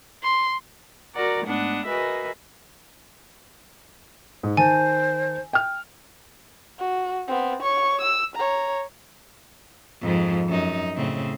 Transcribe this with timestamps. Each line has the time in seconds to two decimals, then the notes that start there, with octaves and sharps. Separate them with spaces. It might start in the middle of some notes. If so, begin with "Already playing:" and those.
0.23 C6
1.14 F#4 A#4 D5 F#5 A#5
1.45 G#2 A3 B3 D4 F#5 D#6
1.85 F#4 G#4 A#4 B4 D#5 E5
4.43 G#2
4.57 D#3 C5 G#5 A5
5.53 G5 F6
6.79 F#4
7.28 B3 C4
7.62 C#5 C#6
8.01 E6
8.35 C#5 A#5
10.02 F2 G#2 F3
10.48 F#2 D#4
10.96 A2 C#3 C4